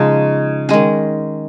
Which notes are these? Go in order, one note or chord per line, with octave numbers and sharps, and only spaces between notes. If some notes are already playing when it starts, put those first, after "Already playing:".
Already playing: C#3 F3 G#3 D#4
D#3 G#3 C#4